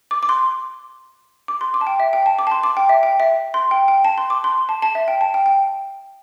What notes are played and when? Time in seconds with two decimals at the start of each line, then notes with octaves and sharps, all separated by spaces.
0.11 D6
0.23 D6
0.29 C6
1.48 D6
1.61 C6
1.74 D6
1.81 A5
1.87 G5
2.00 E5
2.13 G5
2.26 A5
2.39 D6
2.47 A5
2.51 C6
2.64 D6
2.77 G5
2.89 E5
3.03 G5
3.20 E5
3.54 C6
3.71 G5
3.88 G5
4.05 A5
4.18 C6
4.30 D6
4.44 C6
4.69 A5
4.82 A5
4.95 E5
5.08 G5
5.21 A5
5.34 G5
5.46 G5